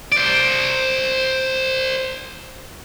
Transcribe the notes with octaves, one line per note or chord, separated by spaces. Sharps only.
C5 D5